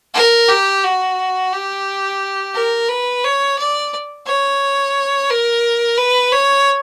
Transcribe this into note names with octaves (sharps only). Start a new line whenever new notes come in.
A#4
G4
F#4
G4
A#4
B4
C#5
D5
C#5
A#4
B4
C#5